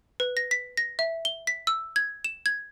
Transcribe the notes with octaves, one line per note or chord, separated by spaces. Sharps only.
B4
A#6
B6
A#6
E5
G7
B6
E6
G#6
E7
G#6